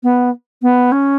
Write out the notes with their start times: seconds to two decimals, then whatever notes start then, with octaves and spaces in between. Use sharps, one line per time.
0.03 B3
0.62 B3
0.92 C#4